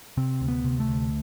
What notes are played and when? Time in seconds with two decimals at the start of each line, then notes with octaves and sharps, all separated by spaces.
0.17 C3 C4
0.41 D2
0.48 B3
0.64 C3
0.80 A3
0.87 D2